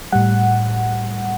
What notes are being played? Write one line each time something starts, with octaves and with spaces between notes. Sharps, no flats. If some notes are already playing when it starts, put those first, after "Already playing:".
A2 G3 F#5